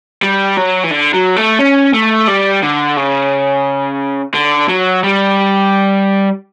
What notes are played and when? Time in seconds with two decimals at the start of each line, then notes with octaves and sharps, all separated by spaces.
0.22 G3
0.57 F#3
0.84 E3
0.91 D3
1.14 F#3
1.37 A3
1.59 C#4
1.94 A3
2.28 G3
2.62 D3
2.97 C#3
4.34 D3
4.69 F#3
5.04 G3